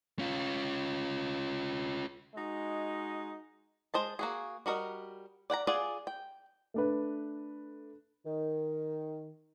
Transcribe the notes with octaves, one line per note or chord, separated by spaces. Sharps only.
C#4 F4
G#3 D#4 F#4 D#5
G#3 C5 D#5 A5
A#3 F#4 G#4
G3 F#4 A#4 D#5
D5 F#5 G5 A#5
F4 G#4 D5 F#5 G#5
G5
A3 D4 B4
D#3